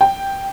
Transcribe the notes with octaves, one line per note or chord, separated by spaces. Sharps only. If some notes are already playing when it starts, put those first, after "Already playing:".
G5